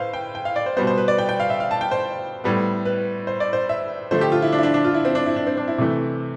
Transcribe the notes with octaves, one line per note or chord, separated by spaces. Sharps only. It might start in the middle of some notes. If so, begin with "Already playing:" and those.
Already playing: A2 B4 C5 F5
G5
G5
F5
D5
C5
B2 G3 B3 C5
C5
B4
D5
G5
G5
F5
E5
F5
A5
G5
C5
A2 G3 B3
B4
C5
D5
C5
E5
D3 F3 A3 C5
G4
F4
E4
D4
E4
D4
D4
F4
E4
C4
D4
E4
D4
C4
D4
E4
C3 E3 A3